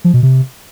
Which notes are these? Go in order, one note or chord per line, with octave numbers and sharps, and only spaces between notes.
F3
B2
C3